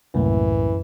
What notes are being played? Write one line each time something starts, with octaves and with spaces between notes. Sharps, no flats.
C2 F#2 A2 E3 A#3